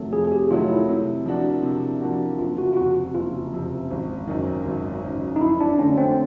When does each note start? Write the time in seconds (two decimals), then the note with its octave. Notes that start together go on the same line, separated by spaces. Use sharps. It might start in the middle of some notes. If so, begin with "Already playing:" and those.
Already playing: F2 C3 D#3 F#3 A3
0.12 F2 G#4
0.28 G#4
0.32 G4
0.50 C3 D#3 F#3 A3 F4
0.69 E4
0.89 C3
1.26 F3 A#3 D4 F#4
1.63 C3
2.01 F3 A#3 D4 F#4
2.39 F#1 F4
2.58 F#4
2.73 F4
2.77 F2 C3 F#4
3.14 F#1 F4
3.52 F2 C3
3.91 G#1
4.27 F#2 D#3
4.65 G#1
5.03 F#2 D#3
5.36 D#4
5.41 F2 E4
5.60 D4
5.79 D3 F#3 A3 C#4 D4
5.98 C4